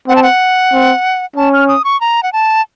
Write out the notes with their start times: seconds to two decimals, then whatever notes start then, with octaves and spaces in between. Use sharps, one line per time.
0.08 C4 F#5
0.16 A5
0.23 F#5
0.73 C4
1.36 C#4 A5
1.53 F6
1.68 D#6
1.85 C#6
2.01 A#5
2.23 F#5
2.33 A5